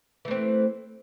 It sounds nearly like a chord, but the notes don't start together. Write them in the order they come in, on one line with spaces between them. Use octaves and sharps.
E3 A3 C4